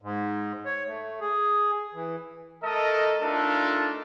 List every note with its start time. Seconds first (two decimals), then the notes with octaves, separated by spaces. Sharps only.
0.02 G#2
0.66 C#5
0.87 A3
1.21 G#4
1.94 E3
2.64 A3 A4 A#4 D#5
3.22 A3 D4 D#4 F4 A4 A#4